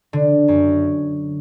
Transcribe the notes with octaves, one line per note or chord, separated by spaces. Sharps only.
D3
F#2